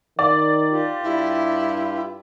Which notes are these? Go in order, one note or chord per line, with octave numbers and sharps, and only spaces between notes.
D#3 D5
F4 G4
G2 E4